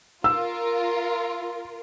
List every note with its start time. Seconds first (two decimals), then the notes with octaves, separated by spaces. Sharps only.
0.24 F4 A#4 E6